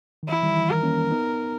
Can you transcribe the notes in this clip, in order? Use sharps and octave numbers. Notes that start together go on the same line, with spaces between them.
D#3
E3 E4
D#3 G3
E3
D#3 A#4
A#3 C#4
B3 D#4